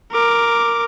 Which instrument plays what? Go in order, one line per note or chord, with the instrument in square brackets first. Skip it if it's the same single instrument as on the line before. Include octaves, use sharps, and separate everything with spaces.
[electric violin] A#4 D6